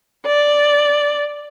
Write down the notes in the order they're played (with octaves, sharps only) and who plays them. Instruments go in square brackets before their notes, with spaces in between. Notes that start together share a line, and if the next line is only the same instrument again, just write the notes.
[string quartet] D5